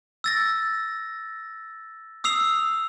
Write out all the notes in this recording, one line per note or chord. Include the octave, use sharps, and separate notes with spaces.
E6 A6 A#6
D#6 E6 C7 F7